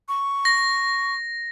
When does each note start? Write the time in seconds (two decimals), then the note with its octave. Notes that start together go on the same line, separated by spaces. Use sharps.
0.09 C#6
0.45 A#6